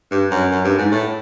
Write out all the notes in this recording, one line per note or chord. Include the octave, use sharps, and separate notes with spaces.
G2
F#2
F#2
G2
G#2
A2